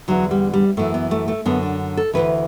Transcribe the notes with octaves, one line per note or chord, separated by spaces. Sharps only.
E2 D3 F#3
G3
G3
F#2 E3 A3
B3
A3
A3
F#2 D3 B3
D4
A4
D2 C#3 E3 B4